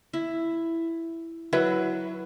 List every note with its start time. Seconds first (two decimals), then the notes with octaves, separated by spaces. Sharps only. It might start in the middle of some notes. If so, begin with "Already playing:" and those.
0.13 E4
1.53 F#3 E4 B4 E5